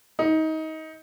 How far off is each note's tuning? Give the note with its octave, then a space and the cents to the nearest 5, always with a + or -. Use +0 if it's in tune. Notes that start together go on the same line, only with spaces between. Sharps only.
D#4 +25